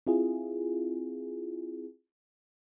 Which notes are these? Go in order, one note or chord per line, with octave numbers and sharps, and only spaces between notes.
C4 E4 F4 G#4